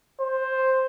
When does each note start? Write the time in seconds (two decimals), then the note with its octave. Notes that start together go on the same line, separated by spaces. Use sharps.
0.20 C5